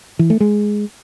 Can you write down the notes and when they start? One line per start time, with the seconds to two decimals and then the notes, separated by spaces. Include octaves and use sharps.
0.19 E3
0.30 A3
0.40 G#3